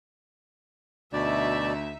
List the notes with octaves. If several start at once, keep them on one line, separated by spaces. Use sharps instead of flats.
D2 B2 D#4 D5 E5